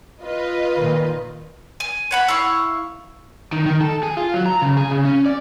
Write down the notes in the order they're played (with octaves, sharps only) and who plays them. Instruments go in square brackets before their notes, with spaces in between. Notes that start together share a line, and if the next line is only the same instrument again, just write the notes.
[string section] F4 B4 D#5
[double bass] A#2 D#3
[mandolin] G#5
C#5 F#5 B5
E4 F5 C#6
[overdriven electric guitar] D#3
D#3
A4
G#4
F4
F#3
A#5
C#3
G#4
C#3
C#4
D5